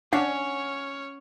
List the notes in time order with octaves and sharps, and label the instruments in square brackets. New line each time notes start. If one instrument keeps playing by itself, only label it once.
[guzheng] C#4 [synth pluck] D4 [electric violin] C#5 F6 [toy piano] F#5